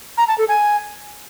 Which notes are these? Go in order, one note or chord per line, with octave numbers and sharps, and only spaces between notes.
A#5
A5
A4
G#5